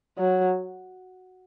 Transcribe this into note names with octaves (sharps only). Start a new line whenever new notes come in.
F#3